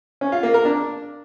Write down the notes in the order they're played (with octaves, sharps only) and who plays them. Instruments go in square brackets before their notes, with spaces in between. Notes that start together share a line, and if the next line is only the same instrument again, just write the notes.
[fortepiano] C#4
F4
A#3
A#4
D4